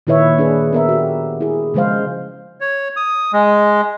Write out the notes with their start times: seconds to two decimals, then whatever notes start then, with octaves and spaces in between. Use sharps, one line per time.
0.07 A#2 D#3 E4 B4 C#5 E5
0.38 D4 G#4 B4
0.73 B3 A#4 E5
0.89 F#4 G4
1.41 E4 G#4
1.74 C#3 F3 G#3 C5 F5
2.61 C#5
2.96 D#6
3.33 G#3